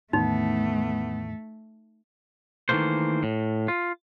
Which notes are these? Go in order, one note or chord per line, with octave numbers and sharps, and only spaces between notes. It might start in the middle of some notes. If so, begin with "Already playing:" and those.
E2 A2 D#3 A3 B3 D#4
D#3 E3 F#3 A3 A#3 C5
A2
F4